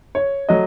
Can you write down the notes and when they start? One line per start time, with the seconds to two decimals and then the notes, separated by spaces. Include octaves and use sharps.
0.15 C#5
0.49 F#3 A3 D#5